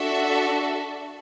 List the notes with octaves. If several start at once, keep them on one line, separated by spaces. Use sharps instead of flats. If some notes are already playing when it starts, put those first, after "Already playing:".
Already playing: D4 F#4 A4 E5